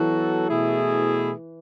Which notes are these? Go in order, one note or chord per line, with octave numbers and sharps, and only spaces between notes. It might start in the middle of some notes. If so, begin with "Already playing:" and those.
Already playing: E3 F#3 B3 F#4 A4
B2 A3 E4 G#4